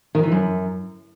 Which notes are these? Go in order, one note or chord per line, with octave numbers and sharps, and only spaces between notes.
D#3
E3
F#2